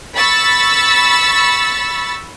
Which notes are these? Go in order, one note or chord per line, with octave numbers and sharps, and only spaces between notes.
B5 C#6 E6 A6